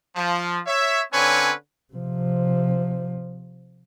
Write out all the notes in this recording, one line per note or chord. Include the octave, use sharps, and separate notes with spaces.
F3
C#5 E5
D3 C4 C#4 B4 C#5 G#5
C3 F3